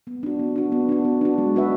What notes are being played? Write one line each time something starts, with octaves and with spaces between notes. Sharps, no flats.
B3
D4 F#4
B3
D4 F#4
B3
D4 F#4
B3
D4 F#4
G#3
B3 F#4 B4 E5